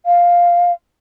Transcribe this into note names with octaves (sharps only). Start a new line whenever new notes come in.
F5